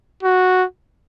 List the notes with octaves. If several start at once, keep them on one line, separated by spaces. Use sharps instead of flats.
F#4